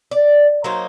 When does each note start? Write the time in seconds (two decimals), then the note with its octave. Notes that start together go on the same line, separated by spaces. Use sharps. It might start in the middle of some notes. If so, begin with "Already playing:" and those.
0.11 D5
0.64 F#3 A#3 D#4 C5